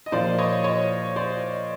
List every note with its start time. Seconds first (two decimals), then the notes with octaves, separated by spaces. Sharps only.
0.06 D#5
0.12 A#2 F3 A#3 C5 D5
0.38 C#5 D#5
0.64 C#5 D#5
1.16 C5 D5